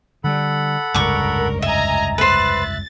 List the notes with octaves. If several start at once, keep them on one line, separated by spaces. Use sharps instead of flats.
D3 G3 A4 F#5 B5
F1 C#2 G2 A#4 C#6 D6
D#5 E5 G#5 A#5
B4 C5 E5 F#6 A6